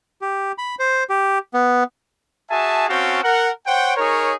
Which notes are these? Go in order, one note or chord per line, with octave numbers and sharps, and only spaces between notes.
G4
B5
C5
G4
B3
F#4 G#4 E5 G#5 A5
C4 C#4 F#4 F5 G5 A5
A#4 F#5
C5 C#5 F#5 G5
D#4 G#4 A#4 C#5